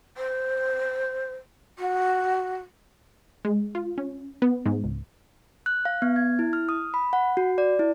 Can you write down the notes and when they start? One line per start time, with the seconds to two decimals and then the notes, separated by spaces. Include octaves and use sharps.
0.17 C5
1.79 F#4
3.45 G#3
3.75 F4
3.98 C#4
4.42 B3
4.66 G#2
4.84 C#2
5.66 F#6
5.85 F5
6.02 B3
6.16 G#6
6.39 E4
6.53 F6
6.69 D#6
6.94 B5
7.13 F#5
7.37 F#4
7.58 D5
7.79 E4